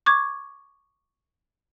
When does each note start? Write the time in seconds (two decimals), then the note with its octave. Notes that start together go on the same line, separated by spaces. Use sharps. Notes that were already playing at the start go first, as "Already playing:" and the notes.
0.06 C#6 D6 G#6